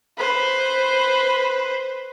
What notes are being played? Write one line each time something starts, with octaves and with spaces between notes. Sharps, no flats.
B4 C5